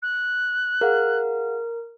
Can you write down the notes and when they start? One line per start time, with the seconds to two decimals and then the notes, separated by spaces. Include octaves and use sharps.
0.02 F#6
0.81 G#4 A#4 F5 F#5